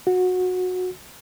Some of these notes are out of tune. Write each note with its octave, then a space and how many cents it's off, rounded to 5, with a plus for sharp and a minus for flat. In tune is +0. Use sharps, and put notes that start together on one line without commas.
F#4 -20